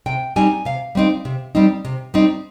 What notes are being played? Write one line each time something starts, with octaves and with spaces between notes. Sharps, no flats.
C3 G5
G3 C4 D#4 G#5
C3 F5
G3 C4 D#4
C3
G3 C4 D#4
C3
G3 C4 D#4